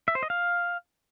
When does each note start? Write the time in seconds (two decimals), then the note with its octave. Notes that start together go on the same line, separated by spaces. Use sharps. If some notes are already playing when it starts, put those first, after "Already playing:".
0.08 E5
0.15 C5
0.23 D#5
0.30 F5